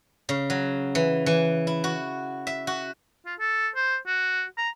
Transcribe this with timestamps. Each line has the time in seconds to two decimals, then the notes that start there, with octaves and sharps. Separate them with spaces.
0.29 C#3
0.50 F#3
0.95 E3
1.26 E3
1.67 E4
1.84 F#4
2.47 E5
2.67 F#4
3.26 F4
3.39 A4
3.76 C5
4.07 F#4
4.58 A#5